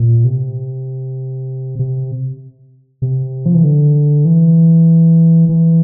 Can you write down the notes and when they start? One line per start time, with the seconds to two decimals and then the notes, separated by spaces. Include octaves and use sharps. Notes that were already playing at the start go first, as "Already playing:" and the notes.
Already playing: A#2
0.24 C3
1.79 C3
3.02 C3
3.46 F3
3.54 E3
3.64 D3
4.25 E3
5.49 E3